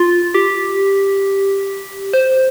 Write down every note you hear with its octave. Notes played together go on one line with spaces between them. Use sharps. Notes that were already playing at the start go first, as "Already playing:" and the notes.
Already playing: F4
G4
C5